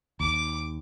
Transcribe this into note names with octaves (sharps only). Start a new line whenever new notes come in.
D#2 D6